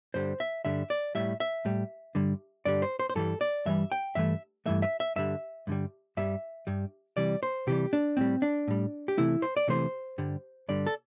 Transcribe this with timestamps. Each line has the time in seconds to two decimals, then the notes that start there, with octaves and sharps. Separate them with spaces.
0.14 G2 D3 G3 C5
0.40 E5
0.65 G2 D3 G3 E5
0.90 D5
1.15 A2 G3 E5
1.40 E5
1.65 A2 G3
2.15 G2 D3 G3
2.65 G2 D3 G3 D5
2.82 C5
2.99 C5
3.10 C5
3.15 G2 E3 G3 A4
3.41 D5
3.66 G2 E3 G3 E5
3.92 G5
4.15 G2 E3 A3 E5
4.66 G2 E3 A3 E5
4.82 E5
5.00 E5
5.16 G2 D3 G3 E5
5.67 G2 D3 G3
6.17 G2 G3 E5
6.67 G2 G3
7.17 C3 E3 G3 D5
7.43 C5
7.67 C3 E3 G3 G4
7.93 D4
8.17 A2 G3 C4
8.42 D4
8.68 A2 G3
9.08 G4
9.17 C3 E3 A3 E4
9.42 C5
9.57 D5
9.68 C3 E3 A3 C5
10.18 G2 D3 G3
10.68 G2 D3 G3 D5
10.87 A4